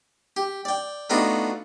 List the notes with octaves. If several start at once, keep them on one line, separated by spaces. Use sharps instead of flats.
G4
D5 G5
A3 B3 D4 D#4 F4 F#4